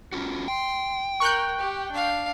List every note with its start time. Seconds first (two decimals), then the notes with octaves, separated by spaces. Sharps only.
0.13 C#4 F4 F#4
0.48 G5 C6
1.20 A#4 C#6 F#6 G6
1.59 G4
1.92 D4 F5